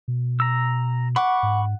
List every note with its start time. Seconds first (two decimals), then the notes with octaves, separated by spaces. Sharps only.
0.08 B2
0.40 A#5 E6
1.16 F#5 B5 C#6 D6
1.43 G#2